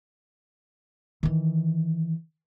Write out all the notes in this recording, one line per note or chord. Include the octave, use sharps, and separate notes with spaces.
D#3 E3